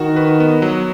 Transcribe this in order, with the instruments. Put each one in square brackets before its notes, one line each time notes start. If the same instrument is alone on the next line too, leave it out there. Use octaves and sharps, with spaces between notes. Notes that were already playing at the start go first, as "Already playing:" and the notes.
Already playing: [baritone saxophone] D#3 [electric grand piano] F#4
[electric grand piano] B4
B3
F#3